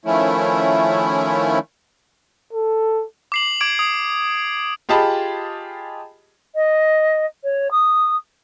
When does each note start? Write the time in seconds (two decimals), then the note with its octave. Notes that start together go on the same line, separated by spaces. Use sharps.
0.06 D#3 F3 A3 C#4 E4
2.53 A4
3.32 D6 C7 F#7
3.61 D6 G#6 D7
3.79 D#6
4.89 F4 G4 G#4 D#5 A5 B5
6.55 D#5
7.44 C#5
7.71 D#6